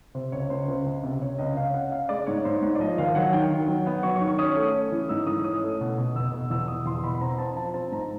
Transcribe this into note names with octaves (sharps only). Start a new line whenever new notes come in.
C3 C5
C#2 C#5
C#2 C5
C#2 C5
C#2
C3
C3 C#5
C#2 D#5
C#4 F5
C#4 F#5
C#4 F5
G#3 D5
G#2 C#5
G#2 C5
G#2 C#5
D5
F3 D#5
D#2 F5
F#3 F#5
D#3 G5
D#3
F#3
B3
F#3 C#6
C#6
D#3
C#6
C#4 D#6
A3
C#4
E3
G#2 E6
E3 D#6
C#4 D#6
A3
B2
B2
F1 E6
B2
E2 E6
B2 D#6
E2 C6
B2 B5
B5
C4 A#5
C4 A5
F3 A5
C4 A5
G#2 A#5